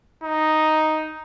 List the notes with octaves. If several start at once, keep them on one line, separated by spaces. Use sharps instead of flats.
D#4